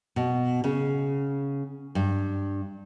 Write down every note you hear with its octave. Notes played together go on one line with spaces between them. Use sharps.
B2
C#3
G2